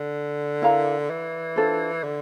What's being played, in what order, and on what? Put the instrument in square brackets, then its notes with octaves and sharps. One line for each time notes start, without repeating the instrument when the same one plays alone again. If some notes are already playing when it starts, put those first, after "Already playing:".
Already playing: [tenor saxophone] D3
[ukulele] E4 A#4 F5 A#5
[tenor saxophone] E3
[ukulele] D4 F4 A4 C5
[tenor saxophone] D3